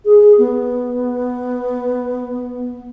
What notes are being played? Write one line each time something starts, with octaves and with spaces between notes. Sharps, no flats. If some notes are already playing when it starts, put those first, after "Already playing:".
G#4
B3